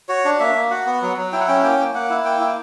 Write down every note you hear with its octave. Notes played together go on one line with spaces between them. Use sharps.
F#4 C#5
D4
A#3 E5
A#3
F#4 F#5
B3
F#3
F#3
E4 G5
F#5
C#4 G5
A#3 G5
A#3
A#3 F#5
E4
A#3 G5
E4